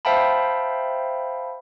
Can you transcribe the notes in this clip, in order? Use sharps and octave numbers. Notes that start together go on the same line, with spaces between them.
C5 E5 F5 G5 A5 B5